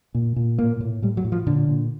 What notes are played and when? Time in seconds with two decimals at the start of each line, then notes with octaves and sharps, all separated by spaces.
0.15 A#2
0.36 A#2
0.58 A2 A#3
0.81 A2
1.02 A2 G3
1.17 F#3
1.25 A2
1.32 F3
1.47 A#2 D3
1.68 A#2